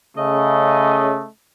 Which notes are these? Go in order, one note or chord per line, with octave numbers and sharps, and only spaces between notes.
C#3 A3 D#5